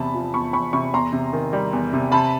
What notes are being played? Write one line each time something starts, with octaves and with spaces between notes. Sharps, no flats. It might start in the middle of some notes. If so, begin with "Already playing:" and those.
Already playing: E2 C3 A5 B5
F3
E2 B5 C#6
E2 B5 C#6
C3 B5 C#6
E2 A#5 C6
C3
D#3
G3
E2
C3
C3 A5 B5